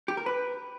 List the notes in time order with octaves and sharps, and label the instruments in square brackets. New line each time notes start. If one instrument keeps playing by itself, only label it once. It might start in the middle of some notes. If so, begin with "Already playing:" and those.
[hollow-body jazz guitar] G4
A#4
B4